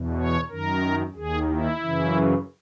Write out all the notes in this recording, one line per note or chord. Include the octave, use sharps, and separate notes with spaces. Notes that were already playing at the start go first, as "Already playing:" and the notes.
Already playing: E2 B2
C#5
F#2 D#3 A#4
D#2 D#3 G#4
E4
F#2 C#3 E3